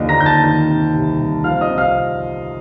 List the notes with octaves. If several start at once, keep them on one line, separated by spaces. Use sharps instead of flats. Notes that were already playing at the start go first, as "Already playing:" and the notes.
Already playing: D#2 D3 F3 D5 D#5
A#5 A#6
D#2 G6
A5 A6
D#3
C3
C2
C2
F3 F5 F6
D#5 D#6
C3
F5 F6